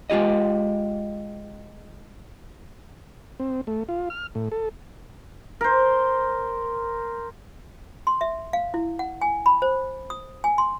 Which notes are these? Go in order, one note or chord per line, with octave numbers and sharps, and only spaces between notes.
G#3 F4 G4 D#5
C4
A3
F4
F6
A2
A4
A#4 C5
C6
E5
F5
E4
F#5
G#5
B5
C5
D#6
G#5
C6